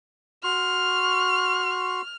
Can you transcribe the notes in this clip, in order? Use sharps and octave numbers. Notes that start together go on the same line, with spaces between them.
F#4 C6 C#6 F6